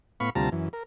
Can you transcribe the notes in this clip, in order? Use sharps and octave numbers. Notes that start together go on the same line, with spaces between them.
A2 B3 F5 B5 C#6
D2 C3 G3 F4 A5 A#5
F#2 E3
A#4